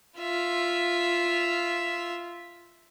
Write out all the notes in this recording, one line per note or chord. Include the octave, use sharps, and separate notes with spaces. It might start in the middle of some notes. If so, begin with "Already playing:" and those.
F4 E5